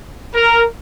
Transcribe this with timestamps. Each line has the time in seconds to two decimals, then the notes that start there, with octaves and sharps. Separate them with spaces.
0.34 A#4